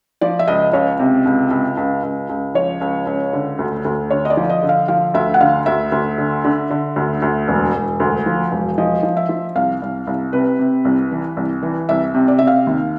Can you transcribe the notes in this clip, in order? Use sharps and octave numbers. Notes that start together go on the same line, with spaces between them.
F3 D5
E5
C#2 D#5
C#2 C#5
C3
C#2
C#2
C#2
C#2
C#2
F3 C#5
C#2
C#2
D3
D2
D2
D3 C#5
D#5
D5
F3
D#5
D3
F5
F3 F5
D2 E5
F#5
D3 F5
D2 E5
D2
D3
D3
D3
D2
D2
E1
E1
D2
F3
E1
F3 D#5
F3
E5
F3
C2 F5
C2
C2
C3 B4
C3
C2
E3
C2
E3
C2 E5
C3
D5
C3 E5
F5
D#2